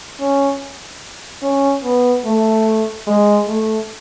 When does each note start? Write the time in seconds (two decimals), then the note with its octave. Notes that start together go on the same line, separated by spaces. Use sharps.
0.20 C#4
1.43 C#4
1.83 B3
2.25 A3
3.07 G#3
3.48 A3